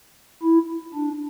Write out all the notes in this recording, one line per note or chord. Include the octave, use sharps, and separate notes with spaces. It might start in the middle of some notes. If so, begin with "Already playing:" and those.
E4
D4